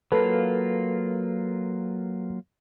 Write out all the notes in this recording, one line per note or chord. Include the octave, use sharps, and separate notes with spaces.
F#3 A#3 F4 A4 B4